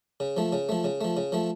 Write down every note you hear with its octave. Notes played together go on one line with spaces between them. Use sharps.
C#3
F3 A3
C#3
F3 A3
C#3
F3 A3
C#3
F3 A3